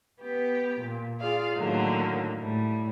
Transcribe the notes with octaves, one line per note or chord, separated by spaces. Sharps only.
B3 G4
A#2
F4 G#4 D5 F5
A2 D3 D#3 F#3 A#3
A2 G3